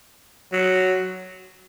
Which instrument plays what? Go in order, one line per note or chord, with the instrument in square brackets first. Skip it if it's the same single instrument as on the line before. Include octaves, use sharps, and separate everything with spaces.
[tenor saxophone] F#3